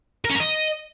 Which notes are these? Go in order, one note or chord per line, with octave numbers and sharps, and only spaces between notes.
A#4
C#4
A#4
D#5